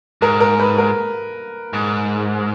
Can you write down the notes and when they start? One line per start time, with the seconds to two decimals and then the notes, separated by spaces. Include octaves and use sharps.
0.22 G#2 A#4
0.40 A#4
0.59 B4
0.78 A#4
1.73 G#2